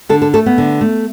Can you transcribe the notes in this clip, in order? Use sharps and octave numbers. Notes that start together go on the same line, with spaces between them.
D3 A4
A4
A3 A4
B3
D3
A3